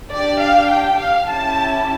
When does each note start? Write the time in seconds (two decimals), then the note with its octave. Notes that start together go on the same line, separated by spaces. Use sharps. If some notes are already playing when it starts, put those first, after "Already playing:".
0.11 D4 G4 D5
0.41 F5
0.70 G5
0.99 F5
1.29 C#4 E4 G4 A5